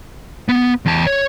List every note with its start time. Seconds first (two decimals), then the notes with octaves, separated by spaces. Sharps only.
0.49 B3
0.86 E2 A5
1.07 C#5